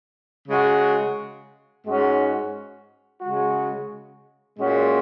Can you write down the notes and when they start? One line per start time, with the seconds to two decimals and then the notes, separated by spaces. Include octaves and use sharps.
0.48 C#3 G#3 F#4
1.85 G#2 G#3 C#4 F#4
3.21 C#3 G#3 F#4
4.58 A#2 G#3 C#4 F#4